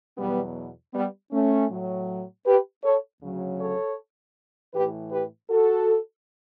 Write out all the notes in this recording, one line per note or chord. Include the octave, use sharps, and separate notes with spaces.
E2 B2 F#3 G3 B3
G3 B3
A3 C#4
A2 F#3
G4 B4
A4 C#5
D2 C#3 F#3
A4 C#5
A2 E3 G4 B4
G4 B4
F#4 A4